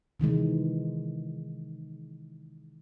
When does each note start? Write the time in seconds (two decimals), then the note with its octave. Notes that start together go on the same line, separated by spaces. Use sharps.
0.20 C3 D#3 E3 G#3